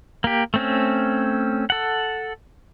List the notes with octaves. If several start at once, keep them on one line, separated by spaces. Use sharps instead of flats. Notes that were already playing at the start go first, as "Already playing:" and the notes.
A#3 G4
A3 C4 C#4
A4 F#5